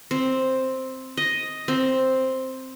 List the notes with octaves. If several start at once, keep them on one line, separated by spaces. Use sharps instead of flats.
C4
D#5
C4